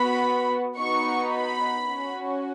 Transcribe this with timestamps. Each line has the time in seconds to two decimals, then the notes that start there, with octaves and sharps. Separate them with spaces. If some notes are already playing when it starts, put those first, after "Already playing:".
Already playing: B3 F#4 B5
0.77 B3 D#4 F#4 C#6
1.32 B5
1.87 C#4 F#4